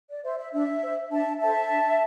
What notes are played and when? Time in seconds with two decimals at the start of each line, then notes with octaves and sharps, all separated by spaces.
0.09 D5
0.23 C5 E5
0.38 E5
0.52 D4 E5
0.82 C5
1.11 D4 E5 A5
1.40 A4 C5 E5 A5
1.69 D4